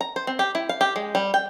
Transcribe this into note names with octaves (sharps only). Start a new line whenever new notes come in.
A#5
C5
C4
G4
E4
F5
G4
G#3
G3
G5